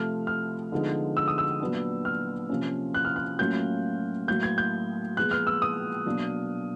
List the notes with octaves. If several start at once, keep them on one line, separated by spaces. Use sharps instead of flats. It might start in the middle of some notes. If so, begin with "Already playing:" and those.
Already playing: C3 F3 A3 F6
F6
D3 F3 G#3 B3 D#4
E6
D#6
E6
A#2 F#3 B3 D4
F6
C3 F3 A#3 C#4
F#6
F6
F#6
A2 F#3 A#3 C#4 F4 G6
A2 F#3 A#3 G6
G#6
G6
A#2 F3 G#3 B3 F#6
F6
E6
D#6
B2 F#3 A#3 D4